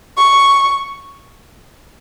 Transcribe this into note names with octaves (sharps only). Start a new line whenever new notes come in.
C#6